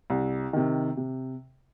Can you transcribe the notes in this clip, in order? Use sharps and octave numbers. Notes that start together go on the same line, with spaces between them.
C2
C3 D#3
C3